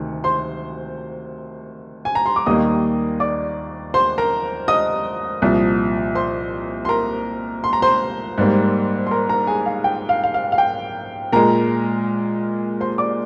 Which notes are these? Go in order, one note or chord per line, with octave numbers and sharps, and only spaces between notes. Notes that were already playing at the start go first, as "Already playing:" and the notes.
Already playing: D2 C3 D#3
C5 C6
G#5
A#5
C6
D6
D#2 D#3 G3 A#3 D#5 D#6
D5 D6
C5 C6
A#4 A#5
D#5 D#6
C2 A#2 F3
C5 C6
C6
A#4 A#5
C6
A#5
C5 C6
G#2 G3 A#3
C6
A#4 A#5
A#4 A#5
G#4 G#5
F5
G5
F5
F5
F5
F5
G5
A#2 G#3 A#4 A#5
C5 C6
D5 D6